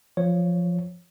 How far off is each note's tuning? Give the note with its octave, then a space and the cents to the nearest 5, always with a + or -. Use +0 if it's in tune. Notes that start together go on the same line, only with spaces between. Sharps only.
F3 +0 C#5 +0